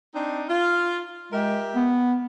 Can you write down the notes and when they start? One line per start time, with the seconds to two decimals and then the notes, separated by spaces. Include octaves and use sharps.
0.14 C4 D4 D#4
0.48 F4
1.32 G#3 G4 A#4 E5
1.76 B3